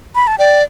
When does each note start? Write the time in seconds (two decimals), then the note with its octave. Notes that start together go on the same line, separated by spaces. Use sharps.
0.15 B5
0.27 A5
0.38 D5 G5